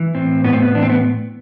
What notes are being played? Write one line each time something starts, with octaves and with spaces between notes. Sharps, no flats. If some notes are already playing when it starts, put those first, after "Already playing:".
Already playing: E3
A2 C4
A2 B3
C4
B3
E3 D4
C4
B3